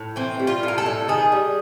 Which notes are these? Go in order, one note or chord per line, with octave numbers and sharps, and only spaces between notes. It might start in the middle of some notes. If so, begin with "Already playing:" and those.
Already playing: A2
E3 C4
G3
F4
A2 A#4
A4
A2
D#3 G#4
G3